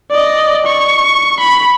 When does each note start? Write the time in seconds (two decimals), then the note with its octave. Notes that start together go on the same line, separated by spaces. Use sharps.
0.11 D5 D#5
0.66 C#6
1.40 B5